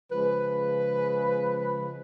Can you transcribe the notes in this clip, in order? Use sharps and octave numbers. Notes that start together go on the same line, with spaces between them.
C#3 F3 G#3 B4